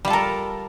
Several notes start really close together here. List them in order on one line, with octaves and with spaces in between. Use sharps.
G3 F4 A4 A#4